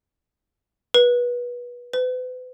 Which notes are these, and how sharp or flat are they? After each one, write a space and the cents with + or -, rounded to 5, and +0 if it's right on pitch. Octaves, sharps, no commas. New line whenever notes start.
B4 -25
B4 +40